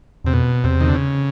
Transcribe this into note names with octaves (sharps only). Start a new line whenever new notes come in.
E2 C3
F2 B2
E2 C3
D#3
D3
C#3